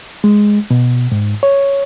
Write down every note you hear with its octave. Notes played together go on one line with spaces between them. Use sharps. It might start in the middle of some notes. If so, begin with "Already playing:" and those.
G#3
B2
G#2
C#5